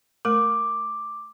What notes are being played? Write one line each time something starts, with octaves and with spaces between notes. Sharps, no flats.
A3 A#4 D6